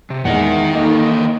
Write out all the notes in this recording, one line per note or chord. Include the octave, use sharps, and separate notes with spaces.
C3
E2 D#3 G#3 E5 F#5
E3 A#3 D#4 A4